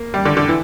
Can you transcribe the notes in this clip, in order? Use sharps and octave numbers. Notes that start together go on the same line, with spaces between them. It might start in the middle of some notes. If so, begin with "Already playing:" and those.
Already playing: A#3
G3
D3
D3
E3